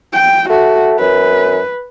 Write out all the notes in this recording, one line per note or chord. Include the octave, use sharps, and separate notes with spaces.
G5
A3 F#4
F#2 B4